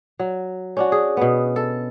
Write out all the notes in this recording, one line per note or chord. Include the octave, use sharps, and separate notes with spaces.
F#3
C#4 D4 F#4
G#4
B2 B3
A4